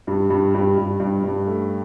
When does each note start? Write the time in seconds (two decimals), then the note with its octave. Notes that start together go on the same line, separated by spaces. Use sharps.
0.07 G2
0.30 G2
0.54 G2
0.78 G2
1.00 G2
1.24 G2
1.47 A3